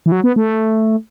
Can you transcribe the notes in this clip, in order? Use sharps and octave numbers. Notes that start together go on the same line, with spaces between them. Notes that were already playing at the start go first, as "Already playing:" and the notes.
E3
F#3
B3
A3